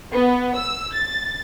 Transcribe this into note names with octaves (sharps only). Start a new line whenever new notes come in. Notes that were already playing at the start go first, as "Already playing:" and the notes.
B3
E6
A6